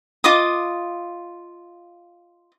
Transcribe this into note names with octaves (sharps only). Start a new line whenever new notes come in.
F4 D#5 D6 D#6